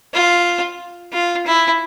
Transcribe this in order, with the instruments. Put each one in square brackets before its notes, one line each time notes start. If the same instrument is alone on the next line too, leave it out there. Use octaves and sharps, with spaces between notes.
[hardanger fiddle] F4
F4
E4